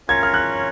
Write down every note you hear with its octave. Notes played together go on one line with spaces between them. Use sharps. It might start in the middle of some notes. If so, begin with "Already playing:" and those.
C#4 F4 A#4 C#5 G#6
F6
F#6